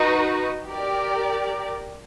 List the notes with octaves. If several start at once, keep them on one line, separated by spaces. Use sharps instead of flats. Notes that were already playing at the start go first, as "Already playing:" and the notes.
Already playing: D#4 F#4 B4
G4 A#4 D5